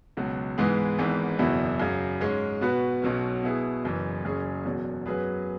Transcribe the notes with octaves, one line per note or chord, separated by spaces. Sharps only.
C#2 B2 F#3
G#2 E3 G#3 B3 G#4
G#1 G#2 E3 B3
F#1 E2 B2 F#3 E4
F#2 C#3 F#3
G#2 G#3 C#4
B2 B3 F#4 B4
B1 B2 F#3 C#4
B2 B3 E4 G#4
F#1 F#2 E3
F#1 F#2 F#3 C#4 G#4
E1 E2 B2 F#3
F#2 F#3 B3 G#4 B4